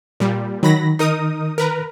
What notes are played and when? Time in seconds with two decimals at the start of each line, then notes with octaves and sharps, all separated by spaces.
0.20 A#2 G3
0.63 D#3 F#3 B5 A#6
0.99 D#4 A#4 D#6
1.58 A#4 B4 A#5